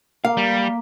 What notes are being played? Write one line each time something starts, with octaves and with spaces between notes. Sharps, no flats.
A#3 F5
G3